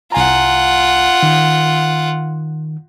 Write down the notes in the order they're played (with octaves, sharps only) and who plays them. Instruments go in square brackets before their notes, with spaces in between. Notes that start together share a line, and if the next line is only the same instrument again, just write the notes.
[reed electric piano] C2 G#5 A#5 [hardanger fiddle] F4 F#5
[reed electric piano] D#3